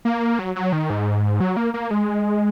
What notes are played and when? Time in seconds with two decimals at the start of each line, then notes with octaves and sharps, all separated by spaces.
0.05 A#3
0.39 F#3
0.56 F#3
0.73 D#3
0.90 G#2
1.40 F#3
1.57 A#3
1.74 A#3
1.91 G#3